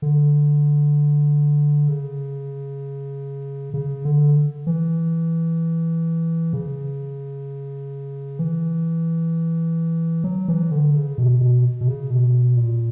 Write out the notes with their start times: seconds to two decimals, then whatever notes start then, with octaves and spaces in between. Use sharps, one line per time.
0.02 D3
1.88 C#3
3.74 C#3
4.05 D3
4.67 E3
6.53 C#3
8.39 E3
10.24 F#3
10.48 E3
10.72 D3
10.95 C#3
11.18 B2
11.41 B2
11.81 B2
11.88 C#3
12.10 B2
12.57 A#2